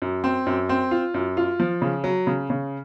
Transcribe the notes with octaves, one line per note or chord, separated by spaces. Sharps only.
F#2
C4
F#2
C4
F4
F#2
F4
F3
C#3
F#3
C#3
C#3